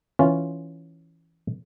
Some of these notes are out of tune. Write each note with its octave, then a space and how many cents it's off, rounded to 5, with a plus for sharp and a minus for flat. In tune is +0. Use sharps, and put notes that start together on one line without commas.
E3 +0 C#4 +0 F4 +0